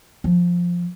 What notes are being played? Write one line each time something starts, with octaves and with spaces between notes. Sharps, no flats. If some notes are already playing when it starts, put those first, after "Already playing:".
F3